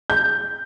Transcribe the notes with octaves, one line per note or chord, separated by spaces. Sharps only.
G6